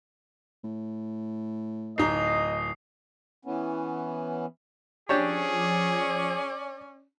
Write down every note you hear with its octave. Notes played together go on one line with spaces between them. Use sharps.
A2
D1 D#4 D#5 D#6 C7
E3 B3 C#4
F3 C#4 D4 G4 G#4 C#5 D5